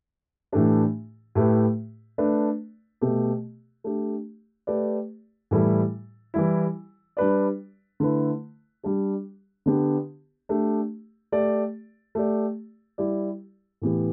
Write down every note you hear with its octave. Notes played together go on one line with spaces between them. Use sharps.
A2 E3 A3 D4 G4
A2 A3 G4 B4
A3 D4 B4 D5
B2 A3 G4
A3 D4 G4
A3 G4 B4 D5
A2 E3 G3 E4 A4
E3 G3 E4
G3 D4 B4 D5
D3 A3 E4 B4
G3 D4 G4
D3 B3 D4 G4 B4
A3 D4 G4
A3 G4 D5
A3 G4 D5
G3 E4 G4 D5
A2 E3 B3 G4